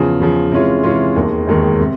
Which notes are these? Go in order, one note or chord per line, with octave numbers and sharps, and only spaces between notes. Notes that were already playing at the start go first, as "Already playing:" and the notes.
Already playing: E2 C#3 F3
E2 C#3 F3
C3 E3 G#3 C#4 F4
C3 E3 G#3 C#4 F4
E1 D#2 D#3 G#3
E1 D#2 D#3 G#3
C3